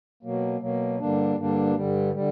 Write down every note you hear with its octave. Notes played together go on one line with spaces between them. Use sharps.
B2 F#3 A#3
B2 F#3 A#3
G2 D3 G3 A#3 D4
G2 D3 G3 A#3 D4
G2 D3 G3
D3 G3